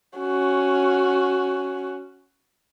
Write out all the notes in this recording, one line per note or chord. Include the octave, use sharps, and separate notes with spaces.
C#4 F#4